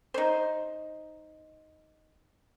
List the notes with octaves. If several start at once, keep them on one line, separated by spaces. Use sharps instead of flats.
D#4 C5